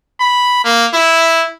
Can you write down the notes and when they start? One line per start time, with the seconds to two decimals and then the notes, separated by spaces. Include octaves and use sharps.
0.20 B5
0.65 A#3
0.93 E4